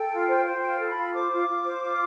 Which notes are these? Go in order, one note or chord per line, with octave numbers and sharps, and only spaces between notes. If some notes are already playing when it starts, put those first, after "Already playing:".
Already playing: A4 G5
F4
C5
C5
F4 G5
A4
B5
F4
C5 D6
F4
F4
C5
F4